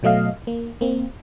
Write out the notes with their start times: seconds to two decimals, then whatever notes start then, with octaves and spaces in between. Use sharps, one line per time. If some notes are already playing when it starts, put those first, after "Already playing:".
0.03 B2 F#3 A3 D#5 F5
0.47 A#3
0.81 A#3 C4